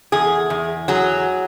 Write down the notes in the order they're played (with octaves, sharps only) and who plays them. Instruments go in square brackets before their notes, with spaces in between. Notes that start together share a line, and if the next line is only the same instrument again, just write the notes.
[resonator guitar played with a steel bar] E2 G#4
E2
F#3 G#4